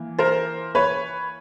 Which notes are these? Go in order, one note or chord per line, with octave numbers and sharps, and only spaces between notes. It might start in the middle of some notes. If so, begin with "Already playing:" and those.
Already playing: E3 A#3
A#4 C5
B4 C#5